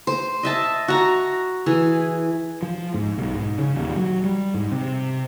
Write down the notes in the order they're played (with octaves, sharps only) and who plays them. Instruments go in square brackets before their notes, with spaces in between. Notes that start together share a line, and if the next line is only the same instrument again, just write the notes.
[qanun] C5
D#5 E5 A5
F#4 A#5
E3 G#4
[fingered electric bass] F3
G#2
B1
G#2
C#3
D#1
F#3
G3
G#2
C3